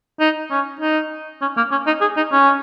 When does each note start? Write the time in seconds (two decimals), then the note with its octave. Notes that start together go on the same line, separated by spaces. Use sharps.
0.20 D#4
0.51 C#4
0.81 D#4
1.41 C#4
1.57 A#3
1.71 C#4
1.87 D#4
2.01 G#4
2.17 D#4
2.32 C#4